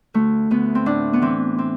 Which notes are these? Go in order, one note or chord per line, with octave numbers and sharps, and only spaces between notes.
D2 A3
D2 B3
C4
A2 D4
B3
E3 C4
C4